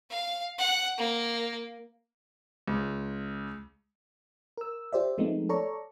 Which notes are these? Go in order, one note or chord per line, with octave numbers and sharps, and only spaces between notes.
F5
F#5
A#3
C#2
A#4 E6
F4 G4 C5 D5 E5
F3 G#3 A3 B3 C4 D#4
A4 C#5 D5 A#5 C#6